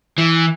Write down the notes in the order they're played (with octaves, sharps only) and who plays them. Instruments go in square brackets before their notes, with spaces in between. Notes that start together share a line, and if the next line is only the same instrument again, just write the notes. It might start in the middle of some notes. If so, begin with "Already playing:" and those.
[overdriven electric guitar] E3